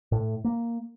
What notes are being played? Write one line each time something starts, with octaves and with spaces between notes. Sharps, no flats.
A2
A#3